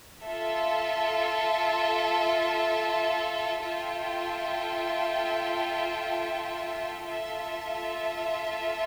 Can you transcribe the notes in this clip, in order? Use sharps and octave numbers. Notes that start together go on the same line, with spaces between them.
F4 A4 E5
F4 A4 E5 G5
F4 A4 E5